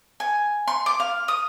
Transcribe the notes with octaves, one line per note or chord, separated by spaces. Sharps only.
G#5
C6
D6
F5
D#6